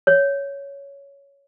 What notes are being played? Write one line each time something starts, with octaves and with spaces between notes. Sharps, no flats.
C#5